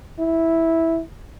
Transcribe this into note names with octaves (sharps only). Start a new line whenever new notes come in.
E4